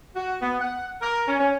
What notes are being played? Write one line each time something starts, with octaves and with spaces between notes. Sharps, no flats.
F#4
B3
F#5
A#4
C#4
C#4